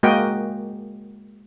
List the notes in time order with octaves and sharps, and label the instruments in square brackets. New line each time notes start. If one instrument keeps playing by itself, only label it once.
[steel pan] G#3 A#3 F#4 A#4 D#5 G5